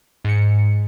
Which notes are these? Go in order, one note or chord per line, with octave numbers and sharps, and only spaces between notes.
G#2 C#7